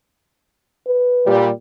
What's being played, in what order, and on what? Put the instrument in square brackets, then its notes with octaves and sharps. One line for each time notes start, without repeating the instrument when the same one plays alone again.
[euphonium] B4
[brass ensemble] A#2 G3